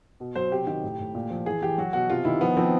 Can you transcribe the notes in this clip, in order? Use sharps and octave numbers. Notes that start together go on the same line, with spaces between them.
B2
F#3 C5
C3 G4
D#3 G4
A2
A2
A#2
F3
E3 G#4
E3 G4
F#3 F#4
B2 F#4
C3 F4
D#3 E4
F3 B3
F3 C4